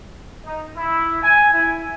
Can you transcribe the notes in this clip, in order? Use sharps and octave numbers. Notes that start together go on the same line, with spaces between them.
D#4
E4
G#5
E4